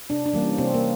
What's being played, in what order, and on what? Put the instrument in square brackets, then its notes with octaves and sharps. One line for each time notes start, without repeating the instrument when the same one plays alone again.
[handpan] C3 D4
D4
E3 G3 A#3
C#4
C3 C4
A#3